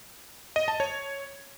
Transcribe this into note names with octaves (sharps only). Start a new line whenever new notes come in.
D#5
A5
C#5